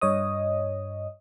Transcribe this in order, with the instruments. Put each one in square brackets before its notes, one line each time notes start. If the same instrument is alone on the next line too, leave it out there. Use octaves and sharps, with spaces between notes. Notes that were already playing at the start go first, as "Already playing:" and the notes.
[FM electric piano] G2 C#5 D#5 D#6